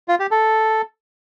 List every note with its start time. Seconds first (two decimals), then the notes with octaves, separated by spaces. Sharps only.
0.08 F4
0.20 G4
0.31 A4